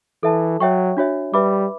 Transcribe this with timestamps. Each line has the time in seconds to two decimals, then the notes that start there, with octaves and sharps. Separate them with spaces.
0.23 E3 A4 E5 A5
0.60 F#3 C#5 E5 G5 C#6
0.97 D4 F#4 C#5 E5
1.33 G3 B4 E5 B5 D6